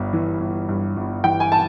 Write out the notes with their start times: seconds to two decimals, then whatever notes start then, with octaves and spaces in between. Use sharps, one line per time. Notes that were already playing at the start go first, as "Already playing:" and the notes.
Already playing: G1 G2
0.13 E3
0.40 G1
0.69 G2
0.97 G1
1.24 E3 G5
1.40 G#5
1.52 A5